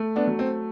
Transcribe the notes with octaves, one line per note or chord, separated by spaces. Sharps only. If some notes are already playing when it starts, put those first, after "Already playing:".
Already playing: A3
B3 D4
F#3
C4